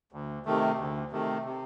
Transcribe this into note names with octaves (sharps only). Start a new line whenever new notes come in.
D2
C3 D#3 A3
D2
C3 D#3 A3
C3